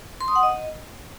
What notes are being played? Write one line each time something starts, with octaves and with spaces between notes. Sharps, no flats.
C6
D#6
F#5
D#5